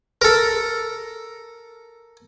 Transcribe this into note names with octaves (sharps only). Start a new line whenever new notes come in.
A4 A#4